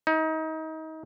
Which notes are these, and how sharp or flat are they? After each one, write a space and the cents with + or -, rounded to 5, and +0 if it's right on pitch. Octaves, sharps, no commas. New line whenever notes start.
D#4 +30